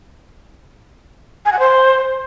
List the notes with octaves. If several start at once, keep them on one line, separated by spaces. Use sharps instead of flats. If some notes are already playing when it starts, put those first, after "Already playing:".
G#5
F#5
C5